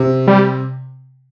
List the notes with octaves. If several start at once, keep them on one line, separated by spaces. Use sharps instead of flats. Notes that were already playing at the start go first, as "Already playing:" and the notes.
Already playing: C3
G3